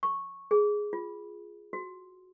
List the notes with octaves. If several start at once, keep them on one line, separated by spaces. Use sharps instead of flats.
C#6
G#4
F4
F#4